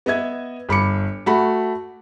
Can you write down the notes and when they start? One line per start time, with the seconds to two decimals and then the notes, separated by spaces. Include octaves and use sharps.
0.06 B3 D#5 E5 G#6
0.69 G1 B5 D6 C#7
1.26 A3 F#4 B5